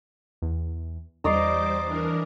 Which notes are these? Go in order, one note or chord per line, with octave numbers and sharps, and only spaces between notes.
E2
E2 G3 C5 D5 D#5 A#5 D6 C7
E3 D4 A#4